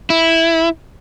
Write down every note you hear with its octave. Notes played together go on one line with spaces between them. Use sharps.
E4